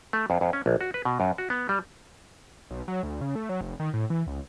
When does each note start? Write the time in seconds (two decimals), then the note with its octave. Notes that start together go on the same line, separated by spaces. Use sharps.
0.13 A3
0.30 F2
0.41 F2
0.53 C#4
0.66 A#1
0.81 F#4
0.94 B4
1.05 B2
1.20 F#2
1.38 F#4
1.50 B3
1.69 G3
2.71 B1
2.88 F#3
3.03 D2
3.21 C#3
3.36 A3
3.49 F#3
3.61 F1
3.80 D#3
3.94 A2
4.10 E3
4.27 C#2